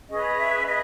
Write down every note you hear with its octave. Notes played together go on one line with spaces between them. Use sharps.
C#4 G#4 B4 D#5
E5
G#4 B4 D#5